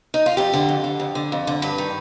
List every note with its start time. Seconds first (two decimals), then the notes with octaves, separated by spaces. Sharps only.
0.14 D#4
0.26 F4
0.37 F2 G4
0.53 D3
0.69 F2
0.84 D3
1.00 F2
1.15 D3
1.32 F2
1.47 D3
1.62 G2 B4
1.78 D#3